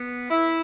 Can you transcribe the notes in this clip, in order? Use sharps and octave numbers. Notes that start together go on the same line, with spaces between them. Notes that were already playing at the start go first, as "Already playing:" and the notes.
Already playing: B3
E4